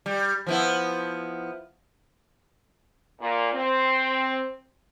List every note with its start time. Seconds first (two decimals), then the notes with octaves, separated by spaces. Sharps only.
0.06 G3
0.47 F3 B3 E4
3.21 A#2
3.53 C4